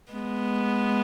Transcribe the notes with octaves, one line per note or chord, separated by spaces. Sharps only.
G#3 B3